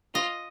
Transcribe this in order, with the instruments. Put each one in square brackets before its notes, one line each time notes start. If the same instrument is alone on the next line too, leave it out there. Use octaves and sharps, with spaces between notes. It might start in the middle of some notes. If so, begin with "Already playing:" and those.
[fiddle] F4 [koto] D#5